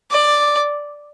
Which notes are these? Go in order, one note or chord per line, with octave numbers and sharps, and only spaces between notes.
D5